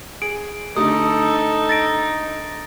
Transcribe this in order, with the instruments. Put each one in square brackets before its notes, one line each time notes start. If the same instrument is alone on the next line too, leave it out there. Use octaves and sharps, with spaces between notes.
[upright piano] G#4 [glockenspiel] D7
[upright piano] D3 A3 [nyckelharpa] D#4 [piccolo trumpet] A4 [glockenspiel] D#6
[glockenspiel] A6 A#6 D7